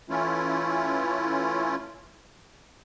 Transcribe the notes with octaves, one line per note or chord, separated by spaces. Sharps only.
E3 A3 C#4 E4 F4